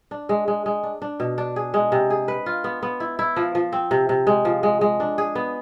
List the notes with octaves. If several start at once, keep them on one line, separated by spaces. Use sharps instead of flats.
D4
G#3
G#3
G#3
D4
D4
B2
D4
G#4
G#3
C3
G#4
B4
F4
B3
B3
E4
E4
F3
F3
C4
C3
C3
G#3
F3
G#3
G#3
D4
G#4
B3